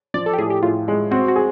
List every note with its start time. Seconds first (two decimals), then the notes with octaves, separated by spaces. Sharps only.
0.14 F3 D5
0.26 A4
0.34 G4
0.38 A2 G#4
0.50 G4
0.63 A2 F4
0.88 G#3
1.11 C4 F#4
1.28 F#4
1.36 G#4